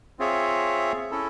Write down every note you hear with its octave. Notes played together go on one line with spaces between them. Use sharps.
C4 F4 G#4 C#5 E5
C#4 E4 A4